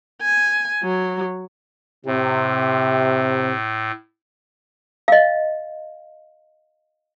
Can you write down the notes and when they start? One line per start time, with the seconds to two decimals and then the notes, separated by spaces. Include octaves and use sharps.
0.22 G#5
0.83 F#3
2.06 A2 C3
5.08 D#5 F5